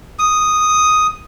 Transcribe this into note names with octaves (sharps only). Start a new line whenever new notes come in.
D#6